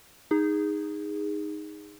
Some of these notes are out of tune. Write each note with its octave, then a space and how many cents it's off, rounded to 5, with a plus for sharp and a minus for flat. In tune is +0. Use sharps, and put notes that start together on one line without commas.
D#4 +0 G#4 -20